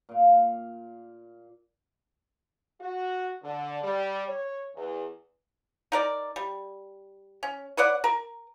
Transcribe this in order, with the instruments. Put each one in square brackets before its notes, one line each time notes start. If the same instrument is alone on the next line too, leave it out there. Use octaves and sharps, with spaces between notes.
[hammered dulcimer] A#2 F5
[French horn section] F#4
D3
G3
C#5
E2
[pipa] D#4 A#4 D5
G3
C#4
B4 C#5 D5 F#5
A#4